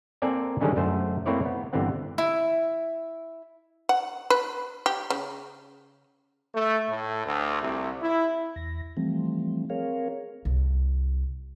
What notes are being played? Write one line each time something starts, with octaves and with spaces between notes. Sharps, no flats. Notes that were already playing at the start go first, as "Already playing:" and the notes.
A#3 C4 A4 D5 G#5 A#5
D3 D#3 G3 G#3 C#4 D4
F#2 A3 C5
A3 A#3 C4 E4 C#5 D5
B3
G1 D3 E3 B3 C4 F#5
E4
F#5
B4
G4
C#3
A3
A2
D2
C2
E4
E2 A#6
E3 F3 G3 A3 C4
C4 G#4 A#4 C#5 F5
C2